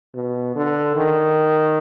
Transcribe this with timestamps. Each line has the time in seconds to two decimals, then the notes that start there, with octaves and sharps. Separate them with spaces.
0.15 B2
0.56 D3
0.96 D#3